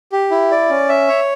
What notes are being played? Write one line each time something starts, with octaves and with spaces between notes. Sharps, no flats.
G4
E4
D5
C#4
E5
C#5